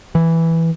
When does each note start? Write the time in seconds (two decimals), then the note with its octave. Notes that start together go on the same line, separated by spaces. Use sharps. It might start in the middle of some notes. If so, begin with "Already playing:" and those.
0.15 E3